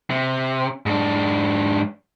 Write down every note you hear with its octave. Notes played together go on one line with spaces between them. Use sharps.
C3
G#2 D4